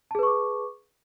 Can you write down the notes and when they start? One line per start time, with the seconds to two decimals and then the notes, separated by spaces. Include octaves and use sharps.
0.11 A5
0.15 G#4
0.19 B4
0.23 C#6
0.27 D6